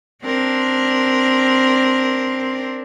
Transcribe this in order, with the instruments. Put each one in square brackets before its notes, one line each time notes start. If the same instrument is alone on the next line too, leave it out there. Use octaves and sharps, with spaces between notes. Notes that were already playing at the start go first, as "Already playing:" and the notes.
[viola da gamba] C4 D4 A#4